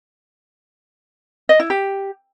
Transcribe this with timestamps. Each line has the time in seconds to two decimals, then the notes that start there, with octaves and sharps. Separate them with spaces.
1.49 D#5
1.60 E4
1.70 G4